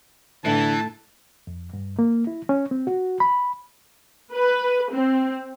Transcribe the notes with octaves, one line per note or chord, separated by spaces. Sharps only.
A2 D3 E3 E4 A5
F2
G2
A#3
E4
C#4
C4
F#4
B5
B4
C4